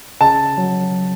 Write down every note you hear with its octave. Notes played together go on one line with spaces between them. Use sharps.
C#3 A5
F#3